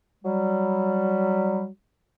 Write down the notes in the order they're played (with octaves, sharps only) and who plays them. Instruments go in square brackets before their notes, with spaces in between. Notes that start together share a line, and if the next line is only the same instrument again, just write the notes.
[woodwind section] F#3 G3